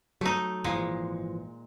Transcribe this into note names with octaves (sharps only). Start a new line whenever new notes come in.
F#3 A3 D#4
G#1 A#2 E3 F3 G#3